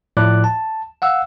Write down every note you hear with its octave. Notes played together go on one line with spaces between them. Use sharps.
A2 F3 D5 D6 F#6
A5
F5 F#5 E6